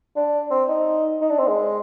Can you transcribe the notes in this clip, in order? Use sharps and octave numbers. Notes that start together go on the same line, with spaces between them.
D4
C4
D#4
D#4
D4
C4
G#3